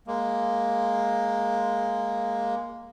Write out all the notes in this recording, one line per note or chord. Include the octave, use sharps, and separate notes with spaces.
G#3 A#3